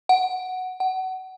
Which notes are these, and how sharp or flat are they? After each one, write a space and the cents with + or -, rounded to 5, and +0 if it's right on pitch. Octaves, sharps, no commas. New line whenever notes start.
F#5 +0
F#5 +25